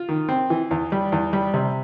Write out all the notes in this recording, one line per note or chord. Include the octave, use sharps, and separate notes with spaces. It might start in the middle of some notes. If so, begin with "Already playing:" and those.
Already playing: F4
D#3
C4
E3
E2
G3
E2
G3
C3